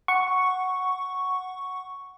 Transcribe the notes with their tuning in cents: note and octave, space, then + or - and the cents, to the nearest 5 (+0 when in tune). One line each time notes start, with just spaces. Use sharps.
F#5 +0 C#6 +0